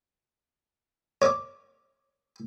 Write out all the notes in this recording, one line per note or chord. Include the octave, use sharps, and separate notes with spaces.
C#5 D6